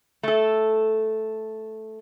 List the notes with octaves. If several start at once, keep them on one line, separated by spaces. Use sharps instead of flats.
A3 A4